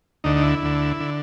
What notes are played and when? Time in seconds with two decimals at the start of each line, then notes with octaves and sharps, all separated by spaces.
0.24 D2 D3 D#4
0.36 D#4
0.43 E4
0.62 D2 D3
1.00 D3